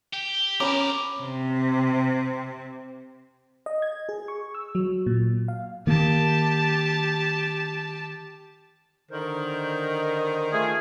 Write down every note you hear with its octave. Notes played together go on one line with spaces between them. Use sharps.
G4
C4 C#4 A#4 B5 D6
C3 C4
D#5
G#6
G#4
C#6
E6
F#3
A#2
F5
D#3 A#3 G4 A5
D3 D#3 A#4 C5
A3 F4 G#4